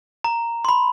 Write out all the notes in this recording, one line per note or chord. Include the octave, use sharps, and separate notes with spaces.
A#5
C6
B5